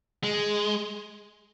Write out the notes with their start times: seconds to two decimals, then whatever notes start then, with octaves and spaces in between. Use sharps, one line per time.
0.24 G#3